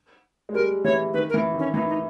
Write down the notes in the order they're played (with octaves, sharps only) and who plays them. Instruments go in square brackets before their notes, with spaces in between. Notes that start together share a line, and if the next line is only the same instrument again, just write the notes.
[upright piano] G#3
[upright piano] G3 [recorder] A#4
[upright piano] E3 [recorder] C#5
[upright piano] D#3 [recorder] B4
[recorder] A#4
[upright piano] E3
D#3
[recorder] C#4
[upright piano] E3 [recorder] D#4
[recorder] D#4